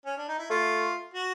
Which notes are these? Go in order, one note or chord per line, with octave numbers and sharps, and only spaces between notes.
C#4
D4
D#4
E4
A3 F4
F#4